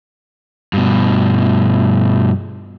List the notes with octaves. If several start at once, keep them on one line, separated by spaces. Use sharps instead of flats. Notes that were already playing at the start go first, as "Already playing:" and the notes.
G2 B2